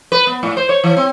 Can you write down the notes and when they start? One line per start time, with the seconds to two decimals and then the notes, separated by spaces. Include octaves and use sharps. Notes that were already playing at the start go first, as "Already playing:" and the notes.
0.12 B4
0.27 B3
0.43 A2
0.57 C5
0.69 C#5
0.84 E3
0.97 C4